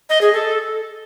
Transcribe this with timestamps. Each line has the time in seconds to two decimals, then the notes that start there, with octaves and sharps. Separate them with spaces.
0.10 D#5
0.21 G#4
0.33 A4